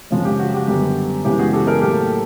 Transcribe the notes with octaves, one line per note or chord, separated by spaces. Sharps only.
F#2 C#3 F3 G#3
G4
F#4
G4
F#2 D3 G3 B3 G4
F#2 C#3 E3 G#3 B3 G4
F#4 G#4
G4 A4
G#4 A#4
A2 F#3 A#3 G4 A4